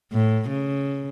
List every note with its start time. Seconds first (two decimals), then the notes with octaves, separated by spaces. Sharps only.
0.12 A2
0.49 C#3